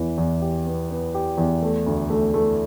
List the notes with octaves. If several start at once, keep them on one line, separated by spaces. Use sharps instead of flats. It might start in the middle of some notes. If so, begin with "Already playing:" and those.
Already playing: E2 E3
E2
G4
B3
B3
G4
E2
A3
D2
A3
A3